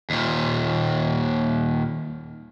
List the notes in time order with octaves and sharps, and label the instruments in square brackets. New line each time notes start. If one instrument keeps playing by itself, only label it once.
[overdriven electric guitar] D#2 A#2